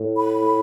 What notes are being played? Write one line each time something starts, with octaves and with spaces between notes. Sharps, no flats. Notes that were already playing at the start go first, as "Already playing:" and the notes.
Already playing: A2
B5